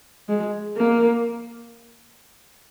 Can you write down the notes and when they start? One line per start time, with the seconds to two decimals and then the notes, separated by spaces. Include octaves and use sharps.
0.29 G#3
0.77 A#3